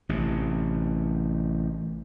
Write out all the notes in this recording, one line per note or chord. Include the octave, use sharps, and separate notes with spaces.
A1 C3